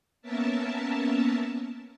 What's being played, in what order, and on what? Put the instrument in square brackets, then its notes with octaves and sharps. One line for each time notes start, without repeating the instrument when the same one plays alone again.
[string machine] A#3 B3 C#4 A#4 E5 A5